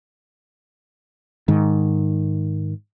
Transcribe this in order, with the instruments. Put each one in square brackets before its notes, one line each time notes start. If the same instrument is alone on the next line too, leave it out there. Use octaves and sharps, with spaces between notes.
[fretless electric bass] G#2 D#3